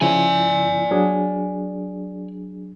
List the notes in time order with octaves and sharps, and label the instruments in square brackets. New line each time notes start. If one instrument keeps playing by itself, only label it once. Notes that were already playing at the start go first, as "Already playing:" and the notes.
[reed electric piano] C#3 F3 E4 [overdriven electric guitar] D5 G#5
[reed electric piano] F#3 D4 G#4